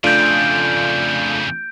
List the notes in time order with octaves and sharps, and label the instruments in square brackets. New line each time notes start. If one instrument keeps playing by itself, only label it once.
[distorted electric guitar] F2 C#3 [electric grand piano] A3 D4 F4 [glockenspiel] G6 D7